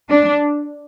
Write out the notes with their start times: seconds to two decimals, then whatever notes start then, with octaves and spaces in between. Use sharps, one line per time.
0.10 D4